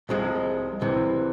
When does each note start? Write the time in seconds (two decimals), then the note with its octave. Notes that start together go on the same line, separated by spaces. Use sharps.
0.09 C2 C3 F3 G#3
0.81 C2 C3 E3